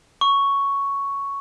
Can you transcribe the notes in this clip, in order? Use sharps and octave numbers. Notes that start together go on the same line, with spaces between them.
C#6